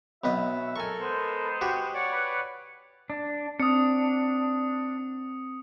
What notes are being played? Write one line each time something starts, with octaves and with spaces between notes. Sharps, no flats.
B1 B3 F#4 D#5 E5
A4 A#4 G#5 C#6
G#3 B3 C5
F#4 G4
C#5 D5 F#5
B4
D4
C4 D4 D#6 C#7